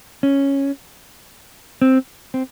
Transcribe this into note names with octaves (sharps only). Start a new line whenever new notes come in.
C#4
C4
C4